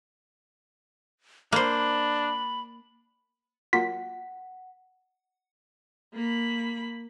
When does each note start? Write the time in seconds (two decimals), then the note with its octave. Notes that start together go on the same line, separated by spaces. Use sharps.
1.52 A#3 D4 C5 B5
3.73 F#3 A#3 F4 F#5 B6
6.14 A#3 B5